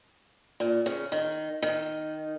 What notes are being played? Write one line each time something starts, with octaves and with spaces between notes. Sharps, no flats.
A#2
C#3
D#3
D#3